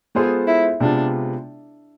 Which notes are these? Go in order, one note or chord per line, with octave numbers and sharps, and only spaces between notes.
G#3 B3 F4 G#4 A4 C5
E4
C3 G#3 B3 D4 F4